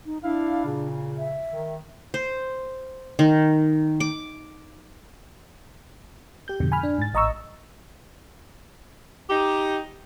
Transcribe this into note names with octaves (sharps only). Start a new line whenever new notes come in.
D#4
D4 E4 F5
A#2 C#3
E5
D#3
C5
D#3
D6
G4 G6
F2 G#2 B2 D3
G#5 B5 F6
D4
G#2 A6
A1 D#5 A#5 C#6 E6
D#4 G4